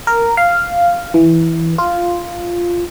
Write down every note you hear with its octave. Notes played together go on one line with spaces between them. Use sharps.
A#4
F5
E3
F4